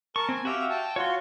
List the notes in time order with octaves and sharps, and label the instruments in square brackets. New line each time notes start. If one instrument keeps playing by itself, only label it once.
[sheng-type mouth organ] A#4 A5 [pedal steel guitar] C#6
[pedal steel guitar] C4 [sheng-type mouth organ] G#5
[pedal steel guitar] F#4 E5 F5 [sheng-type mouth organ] G4 G5
[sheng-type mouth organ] G5 A5
[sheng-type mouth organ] F4 F#4 [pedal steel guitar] C#5 C6